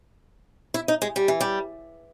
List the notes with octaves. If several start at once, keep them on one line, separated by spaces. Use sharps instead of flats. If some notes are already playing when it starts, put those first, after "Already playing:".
E4
D#4
G#3
G3
E3
G3